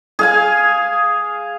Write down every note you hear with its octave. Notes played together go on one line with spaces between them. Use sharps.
G#4 F5 G#5